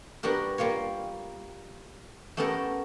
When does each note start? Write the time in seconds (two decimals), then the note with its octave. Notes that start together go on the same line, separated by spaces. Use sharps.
0.23 G3 B3 D4 F#4 A#4
0.58 G3 A#3 F4 C#5
2.37 A3 B3 C#4 G4 A4 A#4